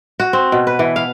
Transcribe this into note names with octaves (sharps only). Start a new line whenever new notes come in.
F#4
C4
B2
B4
E3
F5